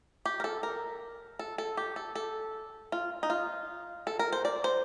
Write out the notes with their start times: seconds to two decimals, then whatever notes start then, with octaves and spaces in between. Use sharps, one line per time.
0.25 G4
0.40 A#4
0.44 A4
0.63 A#4
1.39 A4
1.58 A4
1.77 G4
1.96 A4
2.15 A4
2.92 F4
3.23 D#4
3.30 F4
4.07 A4
4.19 A#4
4.33 C5
4.45 D5
4.64 C5